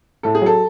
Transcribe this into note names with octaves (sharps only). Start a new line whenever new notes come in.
A2 A4
G#4
F#3 A4